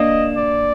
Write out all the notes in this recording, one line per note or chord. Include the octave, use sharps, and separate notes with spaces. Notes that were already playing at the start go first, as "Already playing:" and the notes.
Already playing: A#3 D4 D#5
D5